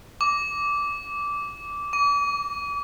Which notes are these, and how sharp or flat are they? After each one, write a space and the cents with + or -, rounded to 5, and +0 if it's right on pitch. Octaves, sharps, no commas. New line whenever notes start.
D6 -15
D6 -40